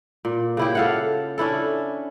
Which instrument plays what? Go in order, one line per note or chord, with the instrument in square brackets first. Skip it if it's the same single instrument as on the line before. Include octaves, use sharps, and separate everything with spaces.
[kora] A#2
C#3 E4 G4
A4 F5 F#5
C#4 D4 E4 A4